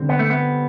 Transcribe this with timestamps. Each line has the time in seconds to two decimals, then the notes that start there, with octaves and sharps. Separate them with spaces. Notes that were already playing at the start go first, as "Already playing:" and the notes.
Already playing: D3 G3 C4
0.09 B3
0.19 A3
0.30 B3